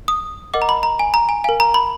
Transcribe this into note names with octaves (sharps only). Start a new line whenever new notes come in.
D#6
A#4 D#5 F#5 D6
A#5
B5
A#5
G#5
A#5
G#5
A#4 F5 G#5
A#5
B5